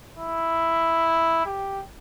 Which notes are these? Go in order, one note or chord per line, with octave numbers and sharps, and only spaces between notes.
E4
G4